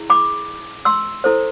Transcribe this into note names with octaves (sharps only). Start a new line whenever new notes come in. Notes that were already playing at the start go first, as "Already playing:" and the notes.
Already playing: E4 G#4
B5 D6
C6 E6
E4 A4 C5